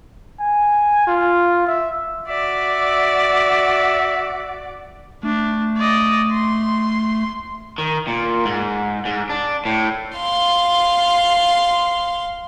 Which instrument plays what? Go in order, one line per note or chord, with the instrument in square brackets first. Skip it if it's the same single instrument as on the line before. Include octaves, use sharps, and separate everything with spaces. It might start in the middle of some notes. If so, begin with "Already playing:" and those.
[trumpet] G#5
F4
E5
[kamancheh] F#4 D5 [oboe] E5
[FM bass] A3 [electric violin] D4
[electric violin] D5 D#5
C6
[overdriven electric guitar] D#3
A#2
G#2
G#2
D4
A2
[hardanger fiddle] F5 C6